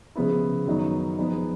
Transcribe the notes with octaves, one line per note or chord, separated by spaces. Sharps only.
C#3 F3 G#3 B3 E4
F#2 D#3 F#3 B3 D#4
F3 G#3 B3 D#4 G#4